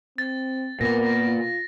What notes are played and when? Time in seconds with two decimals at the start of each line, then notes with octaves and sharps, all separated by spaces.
0.18 C4 A6
0.81 A#2 B3 A#4 A#6
1.25 F4